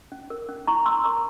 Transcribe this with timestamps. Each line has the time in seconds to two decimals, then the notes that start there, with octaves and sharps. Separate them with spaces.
0.12 C#4
0.30 A#4
0.49 C#4
0.67 E4 A#5 C#6
0.86 C#4 C6 E6
1.04 A#4 A#5 C#6